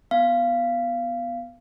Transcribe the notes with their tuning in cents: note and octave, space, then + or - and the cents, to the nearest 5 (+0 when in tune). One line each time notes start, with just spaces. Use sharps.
B3 +0 F5 -20